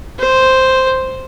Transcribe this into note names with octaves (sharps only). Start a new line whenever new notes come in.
C5